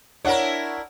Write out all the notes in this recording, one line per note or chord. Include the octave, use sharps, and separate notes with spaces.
D4 E4 A#4 C#5 F#5